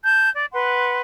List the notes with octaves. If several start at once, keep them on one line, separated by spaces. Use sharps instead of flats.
A5 G6
D5
B4 F#5 C6